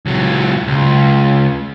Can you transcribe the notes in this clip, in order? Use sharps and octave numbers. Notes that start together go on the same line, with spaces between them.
C#2 F#3
C#2